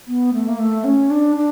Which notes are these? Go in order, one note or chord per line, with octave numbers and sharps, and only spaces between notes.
B3
A3
A#3
A3
C#4
D4
D4